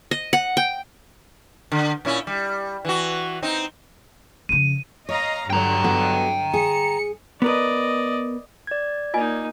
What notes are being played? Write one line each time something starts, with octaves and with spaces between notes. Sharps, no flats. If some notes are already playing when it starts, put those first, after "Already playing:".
D#5
F#5
G5
D3
A#2 C#4 E4
G3
E3 F#4
C4 D#4
F2 C#3 D#7
C#5 D#5 F5 A#5
G2 D3 F#3 G5 A#5
B3 F#4 A4
G#4 C#7
B3 A#4 B4 D5 D#5
D5 G#6
A#3 D#4 F4 D#5 G#5